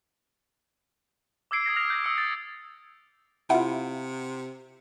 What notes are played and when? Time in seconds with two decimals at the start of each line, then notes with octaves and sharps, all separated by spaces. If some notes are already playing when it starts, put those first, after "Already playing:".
1.51 D6 E6 G#6 C7 D7
1.65 D#6 G#6 A#6 C7
1.76 F6 A#6 C7 F7
1.90 G6 A#6
2.04 D#6 E6 C#7
2.18 A6
3.50 C3 E4 F4 F#5